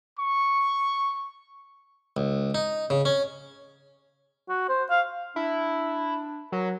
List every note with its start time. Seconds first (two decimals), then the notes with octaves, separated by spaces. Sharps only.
0.18 C#6
2.17 C#2
2.55 D#4
2.90 C#3
3.05 C#4
4.49 F#4
4.69 C5
4.90 F5
5.36 D4 E4
6.52 F#3 A#4